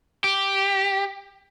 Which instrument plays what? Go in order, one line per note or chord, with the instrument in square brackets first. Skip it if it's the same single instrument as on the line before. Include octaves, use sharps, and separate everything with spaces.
[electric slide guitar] G4